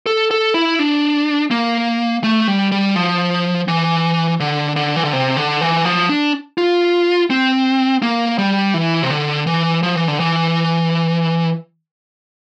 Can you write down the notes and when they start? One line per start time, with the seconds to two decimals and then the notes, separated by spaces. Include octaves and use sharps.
0.06 A4
0.31 A4
0.54 E4
0.79 D4
1.51 A#3
2.24 A3
2.48 G3
2.72 G3
2.95 F3
3.68 E3
4.40 D3
4.76 D3
4.96 E3
5.04 D3
5.13 C3
5.37 D3
5.61 E3
5.85 F3
6.09 D4
6.58 F4
7.30 C4
8.02 A#3
8.38 G3
8.74 E3
9.03 C3
9.10 D3
9.47 E3
9.83 F3
9.96 E3
10.08 D3
10.20 E3